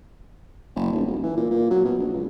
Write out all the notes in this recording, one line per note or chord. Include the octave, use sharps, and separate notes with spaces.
F#1
D#1
D1
E3
A#2
A#2
F#3
B2
A#1
C#2